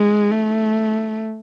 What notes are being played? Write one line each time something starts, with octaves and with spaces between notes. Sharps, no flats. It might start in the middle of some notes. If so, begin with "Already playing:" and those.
Already playing: G#3
A3